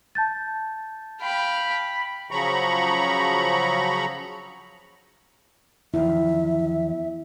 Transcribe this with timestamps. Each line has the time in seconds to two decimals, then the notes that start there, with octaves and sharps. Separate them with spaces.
0.15 A5 G6 A6
1.21 F5 G5 B5
2.31 C#3 F3 F#3 A#5 B5 C#6
5.94 E2 D#3 F3 E4 E5